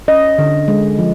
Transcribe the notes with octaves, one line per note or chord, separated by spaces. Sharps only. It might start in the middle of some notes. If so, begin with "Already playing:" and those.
C#4 D#5
D3
G#3
F3